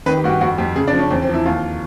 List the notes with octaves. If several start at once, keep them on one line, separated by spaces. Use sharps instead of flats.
D#3 B4
G4
G2 F#4
G4
F2 F#4
F2 G4
C#3 G#4
D4
F3
C#4
E2 C4
C4
F3
E4
D#2 F4